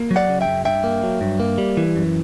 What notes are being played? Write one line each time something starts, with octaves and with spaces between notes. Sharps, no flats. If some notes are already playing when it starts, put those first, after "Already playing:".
Already playing: A#3
F#3
D5 F#5
C#3
E5 G5
F#2
G2 E5 G5
A#3
F#3
G2
A#3
G3
E3
F#2